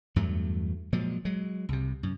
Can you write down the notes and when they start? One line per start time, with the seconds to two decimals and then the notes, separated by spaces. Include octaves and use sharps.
0.16 E2 G2 F#3 A3
0.93 A#2 F3 F#3 G#3
1.25 F#3 G#3
1.69 C2 C3
2.03 F#2